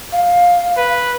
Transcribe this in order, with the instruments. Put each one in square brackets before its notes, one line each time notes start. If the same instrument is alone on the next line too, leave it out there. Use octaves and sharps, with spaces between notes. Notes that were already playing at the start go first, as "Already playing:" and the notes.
[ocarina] F5
[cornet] B4